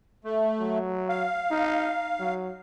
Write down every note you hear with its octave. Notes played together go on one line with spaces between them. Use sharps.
A3
F#3
F5
D#4
F#3